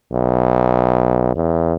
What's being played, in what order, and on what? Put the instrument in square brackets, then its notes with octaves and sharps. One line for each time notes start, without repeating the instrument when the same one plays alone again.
[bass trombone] B1
E2